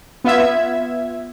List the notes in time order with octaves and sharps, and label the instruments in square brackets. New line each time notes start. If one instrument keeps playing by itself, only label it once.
[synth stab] B3 F4 E5 G#6